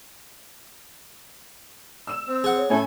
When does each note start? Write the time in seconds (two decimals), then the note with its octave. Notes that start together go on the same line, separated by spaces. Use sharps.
2.07 E6 E7
2.27 C4
2.44 G#4 F#5
2.56 C#5
2.70 A2 A3 C#4 E4 A4 G#5